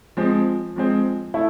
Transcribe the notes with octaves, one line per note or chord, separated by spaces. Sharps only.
F3 G#3 C4
F3 G#3 C4
A3 E4 A4